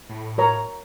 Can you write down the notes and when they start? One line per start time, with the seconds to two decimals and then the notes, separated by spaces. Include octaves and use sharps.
0.09 A2
0.38 A#4 C#5 A#5